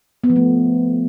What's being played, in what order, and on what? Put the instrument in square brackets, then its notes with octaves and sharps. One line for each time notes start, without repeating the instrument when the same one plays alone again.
[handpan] B3
F3
A3